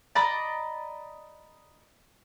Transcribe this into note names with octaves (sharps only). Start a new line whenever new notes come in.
D5 D#5 A#5 B5